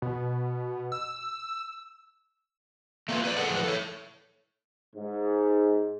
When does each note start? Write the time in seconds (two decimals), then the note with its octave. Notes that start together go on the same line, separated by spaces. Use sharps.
0.02 B2
0.92 E6
3.09 A3 A#3 C4 C#4 F4 B4
3.24 B4 D5
3.37 G#4 A4 F#5
3.50 A2 F3 B4
3.63 A4 C#5
4.95 G#2